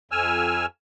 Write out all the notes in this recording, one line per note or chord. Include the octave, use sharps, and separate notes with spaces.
F2 G#5 E6 F6